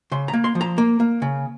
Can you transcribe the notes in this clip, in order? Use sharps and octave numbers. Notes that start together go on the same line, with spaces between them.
C#3 C6
A#5
A#3
C6
F3
A#5
A#3
A#3
C#3